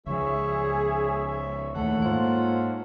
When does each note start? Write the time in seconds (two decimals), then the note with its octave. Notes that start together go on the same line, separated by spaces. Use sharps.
0.06 C#2 F3 G#4 C#5 E5
1.75 D#2 A#2 E3 A3 A4 C#5 F#5
2.02 G#2 A#3 F4 C5